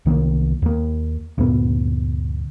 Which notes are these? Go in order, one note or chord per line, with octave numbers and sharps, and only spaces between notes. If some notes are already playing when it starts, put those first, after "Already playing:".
C2 D#3 G3 A#3
D#2 A#3
D2 G2 A#2 B3